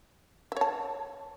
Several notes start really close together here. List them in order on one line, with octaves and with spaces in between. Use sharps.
E5 C#5 A5